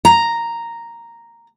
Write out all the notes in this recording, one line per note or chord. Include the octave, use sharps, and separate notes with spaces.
A#5